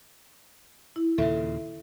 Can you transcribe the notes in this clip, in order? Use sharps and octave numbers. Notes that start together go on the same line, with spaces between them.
E4
D#2 A#2 C#3 A4 E5